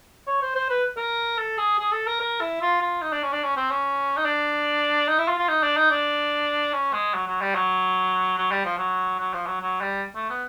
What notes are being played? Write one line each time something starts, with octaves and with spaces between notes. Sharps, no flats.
C#5
C5
C5
B4
A#4
A4
G#4
G#4
A4
A#4
A#4
E4
F4
F4
D#4
D4
C#4
D4
C#4
C4
C#4
D#4
D4
D#4
E4
F4
F4
D#4
D4
D#4
D4
C#4
G#3
F#3
F#3
G3
F#3
F#3
G3
F3
F#3
F#3
F3
F#3
F#3
G3
A3
B3